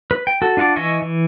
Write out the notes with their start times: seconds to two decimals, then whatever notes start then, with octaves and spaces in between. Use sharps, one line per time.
0.11 B4
0.27 G5
0.42 F#4 A4
0.57 D4 F4 F#5 A5 D6
0.76 E3 D#5 E5 G#5 C#6
1.02 E3